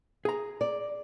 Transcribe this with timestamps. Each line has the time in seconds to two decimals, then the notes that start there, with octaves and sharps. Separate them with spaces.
0.25 G#4 A#5
0.61 D5